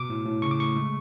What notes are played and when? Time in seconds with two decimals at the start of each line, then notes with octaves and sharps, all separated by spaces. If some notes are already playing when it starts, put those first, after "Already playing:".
Already playing: B2 D6
0.09 A2
0.26 A2
0.42 C#3 C#6
0.51 D6
0.60 A3 C#6
0.76 G#3